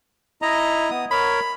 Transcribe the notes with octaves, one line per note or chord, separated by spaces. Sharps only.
E4 D#5 A#5
B3 D#6
A#4 C#5 B5